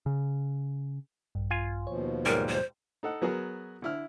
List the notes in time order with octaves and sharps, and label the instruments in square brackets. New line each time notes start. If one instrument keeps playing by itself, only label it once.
[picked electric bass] C#3
[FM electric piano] A#1 G2
[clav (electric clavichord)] F4 G#5
[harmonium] D#2 B2 F3 [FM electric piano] C#5
[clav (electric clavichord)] B1 G#2 G3 [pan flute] A#4
[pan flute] C5
[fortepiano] D#4 A4 F#5
F#3 B3 F#4 G#4 A#4
D3 E4 F6